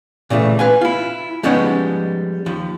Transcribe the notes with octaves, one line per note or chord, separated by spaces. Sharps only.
A#2 C#3 E3 A3
B4 F5 G#5
E4 F4
F3 G3 G#3 B3 C#4 D#4
D#2 F3